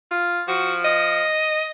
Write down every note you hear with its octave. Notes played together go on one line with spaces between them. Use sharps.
F4
F3 F#4
D#5